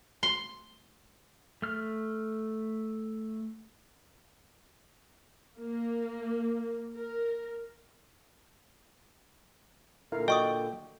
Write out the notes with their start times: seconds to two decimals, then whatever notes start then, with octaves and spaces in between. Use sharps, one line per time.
0.23 C6
1.62 A3 F6
5.60 A#3
6.96 A#4
10.12 A#2 D3 E4 A#4 F5
10.28 F#4 D5 D#5 G5 C#6 D#6